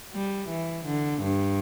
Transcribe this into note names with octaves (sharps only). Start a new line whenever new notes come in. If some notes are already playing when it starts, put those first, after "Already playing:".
G3
E3
D3
G2